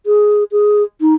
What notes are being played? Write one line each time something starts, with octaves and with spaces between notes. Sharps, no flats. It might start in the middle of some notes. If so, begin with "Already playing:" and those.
G#4
G#4
D#4